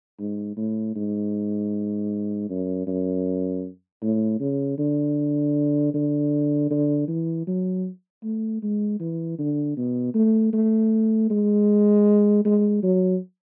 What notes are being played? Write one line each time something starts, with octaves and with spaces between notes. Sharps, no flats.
G#2
A2
G#2
F#2
F#2
A2
C#3
D3
D3
D3
E3
F#3
A3
G#3
E3
D3
B2
A3
A3
G#3
G#3
F#3